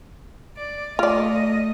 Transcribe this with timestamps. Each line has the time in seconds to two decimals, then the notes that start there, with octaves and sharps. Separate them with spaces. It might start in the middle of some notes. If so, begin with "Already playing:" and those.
0.58 D5
0.99 A3 F4 D5 D#5